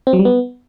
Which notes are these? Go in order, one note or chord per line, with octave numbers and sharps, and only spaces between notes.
C4
F#3
G3
B3